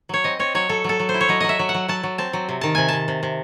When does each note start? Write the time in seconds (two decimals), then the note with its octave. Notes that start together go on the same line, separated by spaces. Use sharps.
0.09 F#3 C#5
0.24 C4 D#5
0.39 C4 C#5
0.55 F#3 C#5
0.69 F#3 A4
0.84 F#3 A4
0.99 F#3
1.09 C5
1.14 E4
1.21 C#5
1.29 F#3 D#5
1.40 F#3 D#5
1.49 E5
1.59 F#3
1.69 F#5
1.74 F#3
1.88 F#3 A5
2.03 F#3
2.18 C4 A5
2.33 F#3
2.49 C3
2.61 D#3 A5
2.75 C3 G#5
2.88 C3 A5
3.08 C3
3.23 C3